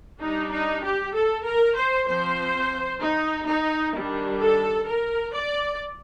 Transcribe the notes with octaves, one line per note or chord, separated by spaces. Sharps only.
G3 D4 D#4
D#4
G4
A4
A#4
C5
F3 C4 C5
D#4
D#4
D#3 G3 D4
A4
A#4
D5